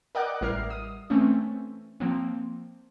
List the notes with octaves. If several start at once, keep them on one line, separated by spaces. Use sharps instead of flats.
A#4 D5 D#5 F#5 D6 F#6
A1 G3 E4 A#4 F6 C7
D#6
E3 A3 C4 C#4
F3 A#3 C4